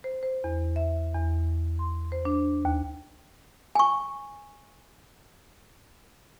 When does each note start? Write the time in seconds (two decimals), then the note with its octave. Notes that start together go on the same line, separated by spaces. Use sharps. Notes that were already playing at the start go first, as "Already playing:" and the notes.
0.04 C5
0.23 C5
0.44 E2
0.76 E5
1.14 E2
1.79 C6
2.12 C5
2.25 D4
2.65 D#2
3.75 G#5 C#6